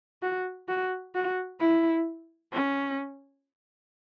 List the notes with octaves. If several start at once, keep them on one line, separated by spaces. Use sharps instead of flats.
F#4
F#4
F#4
E4
C#4